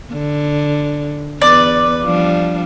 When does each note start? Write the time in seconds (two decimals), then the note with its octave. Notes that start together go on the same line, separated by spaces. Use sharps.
0.13 D3
1.42 E2 B4 D5
2.03 F3 G3 D4